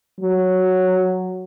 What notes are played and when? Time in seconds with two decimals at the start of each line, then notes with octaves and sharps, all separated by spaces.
0.20 F#3